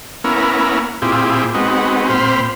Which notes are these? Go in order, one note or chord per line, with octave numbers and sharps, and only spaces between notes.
A#3 B3 C#4 E4 A#4
A#2 C4 E4 F4 G4 G#4
G#3 B3 C4 D#4 F#4
A#2 C4 C5 B5 F6